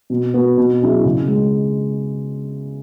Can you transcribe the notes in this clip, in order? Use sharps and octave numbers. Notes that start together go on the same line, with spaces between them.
B2
B3 F#4
B2
F#3 C#4 E4 G#4
C#3
G#3